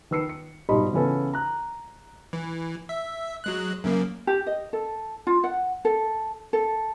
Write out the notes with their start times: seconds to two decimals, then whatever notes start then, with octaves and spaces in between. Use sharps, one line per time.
0.11 D#3 B4 E6 C7 C#7
0.29 C#7
0.69 B1 G#2 G3 D#5 B5 C6
0.93 C#3 E3 B3 C#4 A4 B4
1.33 A#5 F#6
2.33 E3
2.89 E5
3.44 F#3 G#3 F#6
3.84 F#2 C#3 A#3
4.27 G4
4.47 D#5
4.73 A4
5.27 F4
5.44 F#5
5.85 A4
6.53 A4